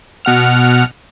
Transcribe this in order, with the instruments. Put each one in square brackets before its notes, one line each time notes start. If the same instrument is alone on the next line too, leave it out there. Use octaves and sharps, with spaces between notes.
[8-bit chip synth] B2 F#5 F6